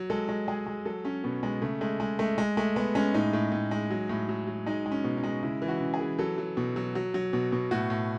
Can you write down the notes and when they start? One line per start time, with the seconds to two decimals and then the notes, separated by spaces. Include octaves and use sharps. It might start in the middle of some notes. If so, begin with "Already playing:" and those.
Already playing: F#3
0.10 G#3 A4
0.29 G#3
0.48 G#3 G#4
0.66 G#3
0.85 F#3 A4
1.04 F#3 C#4
1.24 B2 B3
1.43 B2 G#3
1.62 C#3 A3
1.81 G#3 A3
2.00 G#3
2.19 G#3 A3
2.38 G#3
2.57 G#3 A3
2.76 G#3 B3
2.95 G#3 C#4
3.14 A2 D#4
3.33 A2
3.52 A2
3.71 G#3
3.91 F#3
4.09 A2
4.29 F#3
4.47 F#3
4.66 G#3 D#4
4.86 G#3
4.92 C#4
5.04 B2
5.17 D#4
5.23 G#3
5.43 C#3 E4
5.62 E3
5.68 F#4
5.81 C#3
5.94 G#4
6.00 E3
6.19 F#3 A4
6.38 F#3
6.57 B2
6.76 F#3
6.95 F#3
7.14 F#3
7.33 B2
7.52 B2
7.71 A2 F#4
7.90 A2